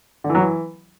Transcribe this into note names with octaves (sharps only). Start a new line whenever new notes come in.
D3
E3
F#3
E3